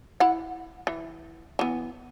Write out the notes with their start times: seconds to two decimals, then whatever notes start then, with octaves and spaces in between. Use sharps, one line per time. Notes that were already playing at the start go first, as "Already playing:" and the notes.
0.20 E4 F#5
0.87 E3
1.59 E3 B3